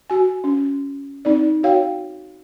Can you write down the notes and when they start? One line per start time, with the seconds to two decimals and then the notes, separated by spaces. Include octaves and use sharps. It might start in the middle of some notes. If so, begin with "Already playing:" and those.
0.10 F#4 G#5
0.44 C#4
1.25 C4 D#4 D5
1.63 F#4 C#5 F5 G5